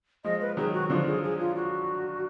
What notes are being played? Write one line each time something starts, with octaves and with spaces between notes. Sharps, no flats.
F3 G#3 D#5
B4
D#3 F#3 G#4
F#4
D3 F3 F4
G#4
G#4
F4
F#4